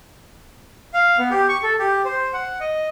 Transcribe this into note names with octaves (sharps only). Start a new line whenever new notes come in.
F5
B3
G4
C#6
A4
G4
C5
F#5
D#5